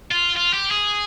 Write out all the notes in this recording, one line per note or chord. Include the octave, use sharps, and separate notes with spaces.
F4
F4
G4
G#4